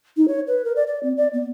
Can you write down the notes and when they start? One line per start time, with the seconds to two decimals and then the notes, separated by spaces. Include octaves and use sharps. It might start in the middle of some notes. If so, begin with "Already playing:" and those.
0.17 D#4
0.28 C#5
0.48 B4
0.65 A#4
0.76 D5
0.87 D5
1.03 C4
1.17 D5
1.33 B3